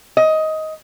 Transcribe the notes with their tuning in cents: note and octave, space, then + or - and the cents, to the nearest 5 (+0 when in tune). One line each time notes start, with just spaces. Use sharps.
D#5 +15